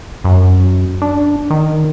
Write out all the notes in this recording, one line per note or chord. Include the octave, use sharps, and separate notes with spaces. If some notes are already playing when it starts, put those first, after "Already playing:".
F#2
D4
D#3